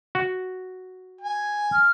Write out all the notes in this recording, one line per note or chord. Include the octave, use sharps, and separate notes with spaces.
F#4
G#5
F6